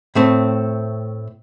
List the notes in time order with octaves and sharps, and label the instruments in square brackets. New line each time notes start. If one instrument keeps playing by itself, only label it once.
[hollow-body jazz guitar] A2 A3 C4